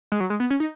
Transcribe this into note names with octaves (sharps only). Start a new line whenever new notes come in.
G#3
F#3
G#3
B3
C#4
D#4